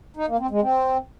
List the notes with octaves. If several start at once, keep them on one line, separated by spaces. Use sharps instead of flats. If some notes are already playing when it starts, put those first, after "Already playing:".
D#4
A#3
C4
G#3
C4